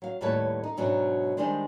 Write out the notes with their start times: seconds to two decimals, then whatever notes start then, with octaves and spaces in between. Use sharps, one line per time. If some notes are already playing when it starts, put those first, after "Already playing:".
0.02 F#3 F5
0.21 D#2 A2 G3 B4 C#5 A5
0.64 D#4
0.77 G#2 B2 F#3 D4 D#4
1.37 D#3 F3 G3 G#3 D4 C5